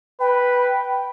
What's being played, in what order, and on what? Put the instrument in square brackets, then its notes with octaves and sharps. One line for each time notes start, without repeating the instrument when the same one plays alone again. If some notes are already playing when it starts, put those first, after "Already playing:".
[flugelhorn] B4 [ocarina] G5